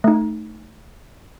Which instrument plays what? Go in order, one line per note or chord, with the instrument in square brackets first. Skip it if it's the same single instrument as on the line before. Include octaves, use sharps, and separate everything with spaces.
[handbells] A3 D#4